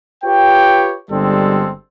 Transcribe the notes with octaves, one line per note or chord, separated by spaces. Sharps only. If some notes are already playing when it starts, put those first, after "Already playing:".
F4 G4 B4 C#5 G5
G1 D3 G3 G#3 C4 A4